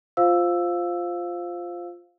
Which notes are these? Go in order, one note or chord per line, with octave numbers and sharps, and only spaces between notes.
F4 C5 F5 E6